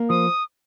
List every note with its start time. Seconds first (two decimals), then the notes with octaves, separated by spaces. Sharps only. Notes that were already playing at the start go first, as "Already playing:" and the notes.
Already playing: A#3
0.09 F3 D#6